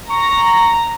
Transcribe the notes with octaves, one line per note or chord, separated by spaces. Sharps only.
A#5 C#6